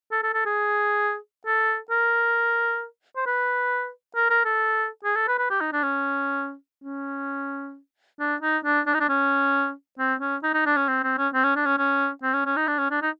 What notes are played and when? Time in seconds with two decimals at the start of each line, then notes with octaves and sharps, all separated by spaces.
0.12 A4
0.23 A4
0.34 A4
0.46 G#4
1.46 A4
1.91 A#4
3.16 C5
3.26 B4
4.16 A#4
4.30 A#4
4.45 A4
5.05 G#4
5.16 A4
5.28 B4
5.38 B4
5.50 G4
5.61 D#4
5.73 D4
5.84 C#4
6.84 C#4
8.20 D4
8.42 D#4
8.65 D4
8.87 D4
8.94 D#4
9.01 D4
9.09 C#4
9.99 C4
10.21 C#4
10.43 D#4
10.54 D#4
10.66 D4
10.77 C#4
10.88 C4
11.04 C4
11.18 C#4
11.34 C4
11.44 C#4
11.56 D4
11.66 C#4
11.78 C#4
12.23 C4
12.34 C#4
12.46 C#4
12.57 D#4
12.68 D4
12.79 C#4
12.91 D4
13.02 D#4